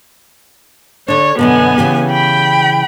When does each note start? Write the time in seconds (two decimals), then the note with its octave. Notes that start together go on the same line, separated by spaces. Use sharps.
1.08 D3 D4 C#5
1.39 F#2 B2 D3 B3 G#5
1.78 C#3 E3 G4
2.10 G5 B5